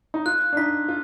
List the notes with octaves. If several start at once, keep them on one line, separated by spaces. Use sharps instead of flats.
D#4
F4 F#6
D4
D#4 B6
F4